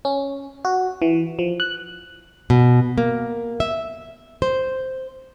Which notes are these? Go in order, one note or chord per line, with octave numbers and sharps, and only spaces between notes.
C#4
F#4
E3
F3
F#6
B2
A#3
E5
C5